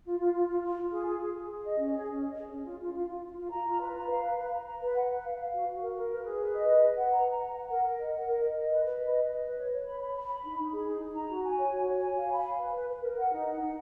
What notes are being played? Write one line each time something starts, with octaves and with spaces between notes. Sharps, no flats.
F4
F4
F4
F4
F4
F4
G#4
G#4
G#4
G#4
G#4
D#5
C#4
G#4
C#4
D#5
G#4
C#4
F4
F4
F4
F4
F4
F4
A#5
F4
B4
A#5
F5
B4
B4
A#5
A#5
B4
F#5
B4
F5
F5
F#4
F#4
A#4
A#4
B4
G#4
B4
D#5
B4
B4
F#5
A#5
A#5
F#5
F#5
A#4
A#4
D#5
F#5
A#4
D#5
D#5
B4
B4
D#5
B4
D#5
B4
C#5
C#5
B5
B5
B5
B5
D#4
D#4
G#4
D#4
D#4
A#5
F#4
G#5
C#5
F#4
C#5
G#5
F5
B5
F5
B4
B4
B4
A#4
F#5
D#4
F#5
D#4